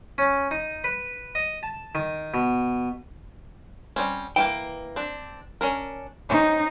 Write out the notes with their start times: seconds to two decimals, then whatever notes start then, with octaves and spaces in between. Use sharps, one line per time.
0.18 C#4
0.51 D#4
0.84 B4
1.35 D#5
1.63 A5
1.95 D#3
2.34 B2
3.96 G3 C4 C#4
4.36 E3 A3 A#3 G5
4.96 C4 D4
5.61 C#4 D4 A#4
6.30 C#4 D#4 C5